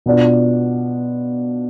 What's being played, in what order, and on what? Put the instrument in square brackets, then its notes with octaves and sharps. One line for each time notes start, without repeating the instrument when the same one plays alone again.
[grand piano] B2 B3 D4 F4